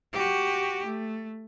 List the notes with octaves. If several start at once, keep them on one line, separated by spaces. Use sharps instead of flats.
F#4 G4
A3